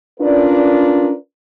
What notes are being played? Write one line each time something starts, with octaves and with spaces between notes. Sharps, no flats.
C#4 D4 F4 A#4 B4 D5